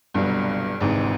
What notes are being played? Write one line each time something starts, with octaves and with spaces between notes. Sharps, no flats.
G1 C2 G2 B2 F#3 B3 D4
G#1 D2 G#2 C3 E3 G#3